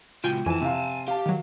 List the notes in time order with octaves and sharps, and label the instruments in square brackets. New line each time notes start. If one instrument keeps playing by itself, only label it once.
[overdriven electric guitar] C#2 F#3 [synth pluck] F4 G5 G#5
[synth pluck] F2 [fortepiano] E3 [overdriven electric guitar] G#5 A5
[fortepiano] C3 F5
[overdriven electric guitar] G4 [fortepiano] F5 A5
[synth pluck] D#3 F#3